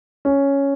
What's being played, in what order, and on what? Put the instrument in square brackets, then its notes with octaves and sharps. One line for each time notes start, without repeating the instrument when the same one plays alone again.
[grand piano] C#4